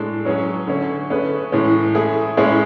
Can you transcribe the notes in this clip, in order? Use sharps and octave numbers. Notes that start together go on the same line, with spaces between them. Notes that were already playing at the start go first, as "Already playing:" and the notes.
Already playing: A2 G#3 D4 A4
F#3 C#4 G#4 C#5
D3 A3 C#4
A3 C#4 G#4 B4
A2 E3 G#3 C#4
A3 E4 G#4
A2 G#3 C#4 E4 G#4